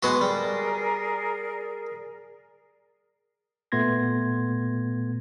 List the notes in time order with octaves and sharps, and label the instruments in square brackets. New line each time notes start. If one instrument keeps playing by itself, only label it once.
[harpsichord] G#3 B3 F#4
[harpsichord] G3 [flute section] G#4 A#4 D5
[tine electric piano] A#2 A3 B3 C6 G#6 A#6